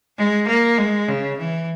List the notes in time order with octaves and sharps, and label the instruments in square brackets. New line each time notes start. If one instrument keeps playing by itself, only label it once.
[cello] G#3
A#3
G#3
C#3
E3